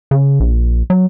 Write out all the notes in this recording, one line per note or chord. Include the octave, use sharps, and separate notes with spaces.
C#3
A#1
F#3